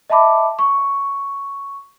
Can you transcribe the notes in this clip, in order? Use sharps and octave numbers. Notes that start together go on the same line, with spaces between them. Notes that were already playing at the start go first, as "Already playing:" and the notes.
D#5 E5 A5 B5 D6
C#6